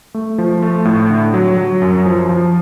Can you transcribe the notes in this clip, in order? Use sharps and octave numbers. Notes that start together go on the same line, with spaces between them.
A3
F3
A3
A2
D3
F#3
F#3
F#2
F3
F3